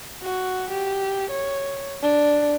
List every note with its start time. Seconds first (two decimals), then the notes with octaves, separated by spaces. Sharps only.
0.23 F#4
0.70 G4
1.30 C#5
2.02 D4